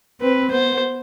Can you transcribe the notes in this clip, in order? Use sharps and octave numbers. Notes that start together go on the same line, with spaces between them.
C4 B4
B3 C5